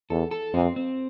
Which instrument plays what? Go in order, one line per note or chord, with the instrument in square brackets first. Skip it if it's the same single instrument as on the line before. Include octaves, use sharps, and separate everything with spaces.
[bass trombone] E2 [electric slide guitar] A4
[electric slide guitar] A4
[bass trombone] F2 [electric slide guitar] C4
[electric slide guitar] C4